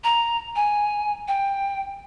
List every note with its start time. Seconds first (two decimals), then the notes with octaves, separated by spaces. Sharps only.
0.04 A#5
0.56 G#5
1.28 G5